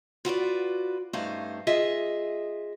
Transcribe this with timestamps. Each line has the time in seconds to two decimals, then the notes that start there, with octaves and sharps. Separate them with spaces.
0.25 F4 F#4 B4 D5
1.13 G2 A3 C#4 D#4 C5 F5
1.67 F4 G#4 D#5 E5